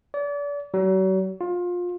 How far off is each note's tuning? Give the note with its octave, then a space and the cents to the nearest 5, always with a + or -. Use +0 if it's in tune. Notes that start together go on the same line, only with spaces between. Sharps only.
D5 -35
F#3 +40
F4 +20